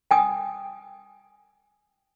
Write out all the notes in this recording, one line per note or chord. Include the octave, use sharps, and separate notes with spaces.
G5 G#5 D#6